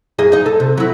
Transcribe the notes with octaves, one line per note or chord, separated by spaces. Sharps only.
F#2 G#4 D#5
D#4 D#5
A4
C3
F#3 E4